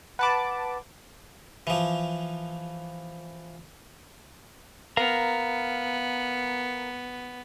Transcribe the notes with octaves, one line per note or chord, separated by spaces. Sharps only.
B4 F#5 A5 B5 D6
E3 F3
B3 A#4 F5 A#5